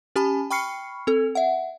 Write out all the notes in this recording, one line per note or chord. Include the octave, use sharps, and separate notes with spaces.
C#4 G4 G#5 A5 B5
G5 B5 C#6 F6 C7 C#7
C4 A4
E5 F#5